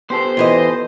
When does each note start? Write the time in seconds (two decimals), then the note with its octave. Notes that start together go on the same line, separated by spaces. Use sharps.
0.10 B3 G4 A4 C5
0.37 E2 E3 D#5